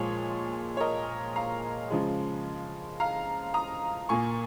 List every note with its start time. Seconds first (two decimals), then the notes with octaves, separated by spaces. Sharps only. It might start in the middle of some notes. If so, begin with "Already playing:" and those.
Already playing: A#2 F3 G#3 G#4 C#5
0.77 C#5
0.80 A#4 D#5
1.36 F5 A#5
1.90 C#3 F3 G#3
3.00 F5 A#5
3.54 A#5 D#6
4.09 A#2 A#3 G#5 C#6